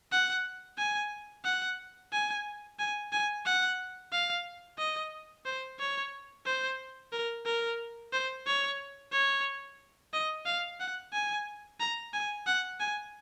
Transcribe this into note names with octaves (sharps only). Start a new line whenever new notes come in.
F#5
G#5
F#5
G#5
G#5
G#5
F#5
F5
D#5
C5
C#5
C5
A#4
A#4
C5
C#5
C#5
D#5
F5
F#5
G#5
A#5
G#5
F#5
G#5